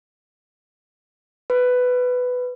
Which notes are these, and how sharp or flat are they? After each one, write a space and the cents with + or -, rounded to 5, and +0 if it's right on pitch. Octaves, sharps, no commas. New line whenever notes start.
B4 +10